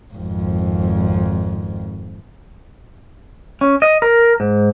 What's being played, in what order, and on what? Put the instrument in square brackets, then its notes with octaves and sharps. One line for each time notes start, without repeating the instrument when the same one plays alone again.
[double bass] G#1 F2
[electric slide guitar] C#4
D#5
A#4
G#2